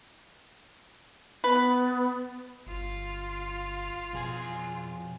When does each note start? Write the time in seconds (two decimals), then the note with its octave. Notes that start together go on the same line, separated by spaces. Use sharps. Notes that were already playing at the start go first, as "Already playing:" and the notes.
1.44 B3 B4
2.66 G1 F4
4.13 F2 B2 G#4 G#5